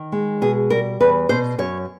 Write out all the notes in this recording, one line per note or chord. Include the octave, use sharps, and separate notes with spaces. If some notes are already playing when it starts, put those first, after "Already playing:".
Already playing: D#3
G#3
B2 G#4
G3 A#4
E2 B4
B2 C5
F#2 C#5